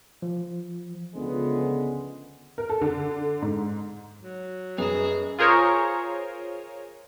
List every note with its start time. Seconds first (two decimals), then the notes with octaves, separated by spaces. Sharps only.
0.22 F3
1.15 C#2 D3 F3 G#3 B3
2.58 A#4
2.69 A4
2.82 D3
3.42 G#2
4.21 F#3
4.78 F#2 G#4 B4 D#5
5.39 F4 G#4 A#4 C5 C#5